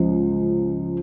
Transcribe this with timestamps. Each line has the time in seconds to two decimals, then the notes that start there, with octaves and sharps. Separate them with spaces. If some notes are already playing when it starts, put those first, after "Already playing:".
Already playing: C#2 F3